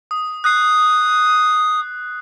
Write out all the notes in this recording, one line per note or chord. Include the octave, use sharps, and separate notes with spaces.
D#6
D#6 F#6 C7